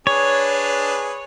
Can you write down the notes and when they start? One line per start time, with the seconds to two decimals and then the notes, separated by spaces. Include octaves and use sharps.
0.07 D4 G#4 B4 C#5